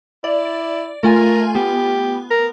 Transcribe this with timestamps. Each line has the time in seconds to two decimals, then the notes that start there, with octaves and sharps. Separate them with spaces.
0.24 E4 D5
1.03 A3 F4 A#4 G#5
1.55 B3 G4
2.31 A#4